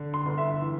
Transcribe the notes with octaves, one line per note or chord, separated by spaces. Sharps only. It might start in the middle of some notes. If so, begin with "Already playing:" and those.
Already playing: D3
C6
G1
E5
E3